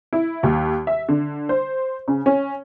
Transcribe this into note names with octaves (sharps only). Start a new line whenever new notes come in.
E4
D#2
E5
D3
C5
C#3
C#4